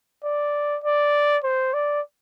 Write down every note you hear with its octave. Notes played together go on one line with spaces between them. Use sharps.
D5
D5
C5
D5